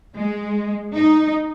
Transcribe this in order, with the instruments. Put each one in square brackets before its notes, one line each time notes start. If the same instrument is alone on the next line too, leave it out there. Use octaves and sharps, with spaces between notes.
[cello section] G#3
D#4